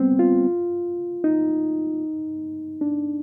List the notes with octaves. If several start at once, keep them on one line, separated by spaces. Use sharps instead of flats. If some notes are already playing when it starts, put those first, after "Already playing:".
Already playing: G3 B3 C4
F4
D#4
D4